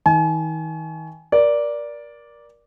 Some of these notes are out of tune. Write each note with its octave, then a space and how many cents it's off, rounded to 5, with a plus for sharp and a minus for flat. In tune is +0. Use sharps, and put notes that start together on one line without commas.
D#3 +45 G#5 +40
A#4 +25 D5 -5